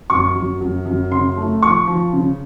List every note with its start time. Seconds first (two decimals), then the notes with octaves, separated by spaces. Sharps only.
0.10 F#2 C#6
0.35 F#2
0.61 F#2
0.86 F#2
1.11 C#3 C6
1.37 A3
1.63 F3 C#6
1.87 F3
2.13 C#3